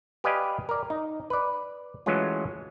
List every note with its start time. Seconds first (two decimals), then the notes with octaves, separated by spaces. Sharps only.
0.24 G4 B4 D5 D#5 F5 G#5
0.69 A#4 D5
0.90 D#4
1.30 B4 D5
2.06 E3 F#3 G#3 A3 C#4 F4